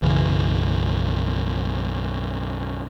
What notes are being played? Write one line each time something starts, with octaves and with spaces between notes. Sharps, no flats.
B1 F#2 C#3 E3